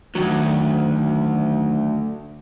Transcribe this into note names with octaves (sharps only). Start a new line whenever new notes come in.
D2 D#3 F#3